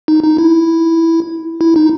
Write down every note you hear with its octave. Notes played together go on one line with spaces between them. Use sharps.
D#4
D#4
E4
E4
D#4